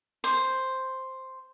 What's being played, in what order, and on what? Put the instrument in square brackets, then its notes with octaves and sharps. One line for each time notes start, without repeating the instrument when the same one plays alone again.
[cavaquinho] C5